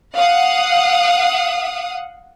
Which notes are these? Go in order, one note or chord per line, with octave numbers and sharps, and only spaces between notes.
F5 F#5 D#6